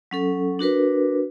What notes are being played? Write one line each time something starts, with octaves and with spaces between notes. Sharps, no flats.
F#3 C#4 A4
D4 F#4 A#4 B4